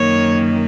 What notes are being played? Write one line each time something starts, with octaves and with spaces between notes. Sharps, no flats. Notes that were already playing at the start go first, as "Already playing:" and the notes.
Already playing: F#2 D#3 A#3 C#5